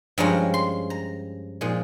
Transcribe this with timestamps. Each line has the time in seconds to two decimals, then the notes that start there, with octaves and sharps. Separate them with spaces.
0.18 G2 F3 G#3 C#4 A#5
0.54 C6
0.90 A#5
1.61 A#2 F3 G#3 D#4